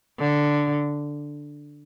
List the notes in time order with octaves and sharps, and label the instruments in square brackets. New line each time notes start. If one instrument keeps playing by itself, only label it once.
[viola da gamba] D3